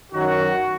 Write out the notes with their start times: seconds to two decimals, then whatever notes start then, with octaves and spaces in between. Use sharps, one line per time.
0.11 F#2 D#3 F#3 F#4